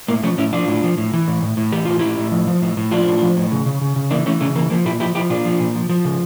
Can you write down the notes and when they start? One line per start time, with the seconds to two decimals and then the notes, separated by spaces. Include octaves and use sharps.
0.08 A2 A#3
0.23 F3 A3 C#4
0.38 A2 C#4 E4
0.53 F3 D4 F4
0.68 A2
0.84 F3
0.98 A2
1.14 E3
1.28 A2
1.43 A2
1.57 A2
1.72 E3 G4
1.85 A2 F4
1.99 A2 E4 G4
2.18 A2
2.32 F3
2.47 F3
2.61 A2
2.77 A2
2.91 F3 D4 F4
3.07 A2
3.22 F3
3.37 A2
3.51 C#3
3.66 C#3
3.81 C#3
3.96 C#3
4.11 E3 A#3 D4
4.26 E3 A3 C#4
4.40 C#3 A3 C#4
4.55 E3 A#3
4.70 F3 A#3
4.85 A#2 E4 G4
5.00 F3 E4 G4
5.15 F3 E4 G4
5.30 A#2 D4 F4
5.45 F3
5.60 A#2
5.76 F3
5.89 F3
6.05 C#3